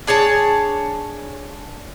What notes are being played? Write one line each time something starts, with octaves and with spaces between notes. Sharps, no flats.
D4 G#4 C#5 A5